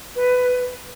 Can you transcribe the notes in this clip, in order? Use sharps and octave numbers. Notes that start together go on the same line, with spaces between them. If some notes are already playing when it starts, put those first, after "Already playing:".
B4